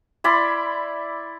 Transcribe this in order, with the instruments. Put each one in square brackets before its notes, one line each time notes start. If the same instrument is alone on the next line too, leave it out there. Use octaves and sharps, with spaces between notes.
[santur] E4 D5 B5 C6